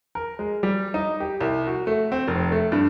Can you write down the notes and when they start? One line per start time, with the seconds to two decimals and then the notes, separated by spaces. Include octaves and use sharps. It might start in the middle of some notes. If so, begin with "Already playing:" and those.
0.15 A#4
0.39 G#3
0.63 G3
0.94 D#4
1.20 G4
1.41 C2
1.67 F#4
1.87 A3
2.12 C4
2.28 F1
2.52 A3
2.72 G2